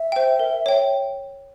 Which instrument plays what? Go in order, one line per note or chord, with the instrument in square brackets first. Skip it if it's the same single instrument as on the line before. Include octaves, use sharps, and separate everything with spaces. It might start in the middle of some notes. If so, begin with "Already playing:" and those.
Already playing: [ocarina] E5
[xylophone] C5 G5
A#4
C#5 G5